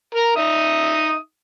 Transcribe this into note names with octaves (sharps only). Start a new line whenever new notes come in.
A#4 A#5
D#4 E5 D#6